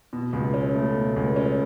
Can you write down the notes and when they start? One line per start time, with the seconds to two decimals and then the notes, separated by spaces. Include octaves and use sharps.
0.13 B2
0.33 C#2
0.54 C#4
0.74 A3
0.95 B2
1.16 C#2
1.36 C#4